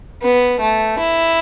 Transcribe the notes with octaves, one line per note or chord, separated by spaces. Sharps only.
B3
A3
E4